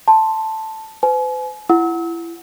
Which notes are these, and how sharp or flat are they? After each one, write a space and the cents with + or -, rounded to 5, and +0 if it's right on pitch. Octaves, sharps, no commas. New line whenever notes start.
A5 +0 C6 +0
B4 +45 G#5 +40
E4 +30 F#5 +0 E6 -40